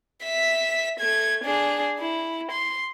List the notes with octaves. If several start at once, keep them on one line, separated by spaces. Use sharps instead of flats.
E5 B6
A3 G#6
D4 G#4
E4
C6